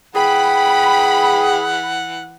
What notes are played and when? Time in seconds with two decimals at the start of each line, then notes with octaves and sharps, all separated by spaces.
0.15 E3 G#4 F#5 G5 B5